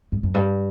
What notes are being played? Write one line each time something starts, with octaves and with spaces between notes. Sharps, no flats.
G2
F#2
G2